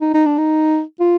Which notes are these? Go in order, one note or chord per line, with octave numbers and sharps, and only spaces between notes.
D#4
D#4
D4
D#4
F4